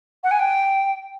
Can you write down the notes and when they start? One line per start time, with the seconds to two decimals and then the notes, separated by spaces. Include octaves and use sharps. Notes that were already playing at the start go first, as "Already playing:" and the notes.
0.23 F#5
0.31 G#5
0.39 G5